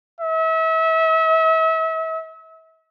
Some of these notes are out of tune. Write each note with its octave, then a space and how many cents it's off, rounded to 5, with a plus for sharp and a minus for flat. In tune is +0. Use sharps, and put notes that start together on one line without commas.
E5 -35